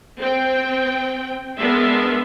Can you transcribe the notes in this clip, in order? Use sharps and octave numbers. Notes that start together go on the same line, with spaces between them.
C4 G5
G#3 B3 D4 A#4 E5 C6